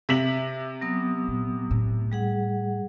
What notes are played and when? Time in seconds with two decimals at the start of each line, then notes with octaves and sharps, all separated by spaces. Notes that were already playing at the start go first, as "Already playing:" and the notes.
0.09 C3 E5 B6 F#7
0.81 F#3 B3 D#6
1.28 A#2
1.71 A2
2.12 G3 G#4 F#5